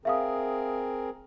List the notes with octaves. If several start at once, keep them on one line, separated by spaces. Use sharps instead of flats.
C4 G#4 A#4 E5 F5 D#6